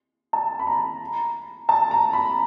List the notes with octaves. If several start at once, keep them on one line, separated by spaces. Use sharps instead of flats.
A5
B5
A#5
A5
A#5
B5